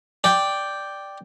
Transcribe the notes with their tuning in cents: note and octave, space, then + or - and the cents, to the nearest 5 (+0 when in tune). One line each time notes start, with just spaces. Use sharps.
D5 +0 G5 +0